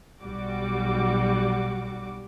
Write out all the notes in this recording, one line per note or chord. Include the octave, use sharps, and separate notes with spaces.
B1 G3 F#4 D6